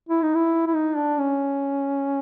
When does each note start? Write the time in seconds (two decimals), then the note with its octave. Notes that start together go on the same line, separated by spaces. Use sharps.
0.09 E4
0.22 D#4
0.35 E4
0.67 E4
0.75 D#4
0.97 D4
1.19 C#4